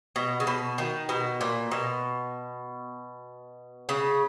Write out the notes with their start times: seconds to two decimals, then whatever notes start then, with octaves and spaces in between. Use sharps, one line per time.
0.16 B2
0.40 C#3
0.47 B2
0.78 D#3
1.09 B2
1.41 A#2
1.71 B2
3.89 C#3